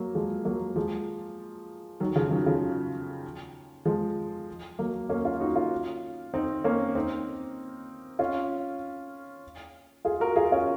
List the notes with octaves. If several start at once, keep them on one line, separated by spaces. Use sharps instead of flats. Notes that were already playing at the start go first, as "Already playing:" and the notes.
Already playing: F#3 A#3
F3 G#3
F#3 A#3
F3 G#3
D#3 F#3
C#3 F3
D#3 F#3
C#3 F3
F3 G#3
F#3 A#3
A#3 C#4
C#4 F4
D#4 F#4
C#4 F4
C4 D#4
A#3 C#4
C4 D#4
C#4 F4
F4 G#4
F#4 A#4
F4 G#4
C#4 F4